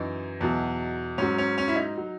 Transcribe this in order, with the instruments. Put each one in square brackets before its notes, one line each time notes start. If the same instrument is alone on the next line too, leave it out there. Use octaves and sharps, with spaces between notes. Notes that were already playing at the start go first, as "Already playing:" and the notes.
Already playing: [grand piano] F#2 E3 D#4
E2 B2 F#3
G#2 F#3 C#4
C#4
C#4
E4
D#4
F#3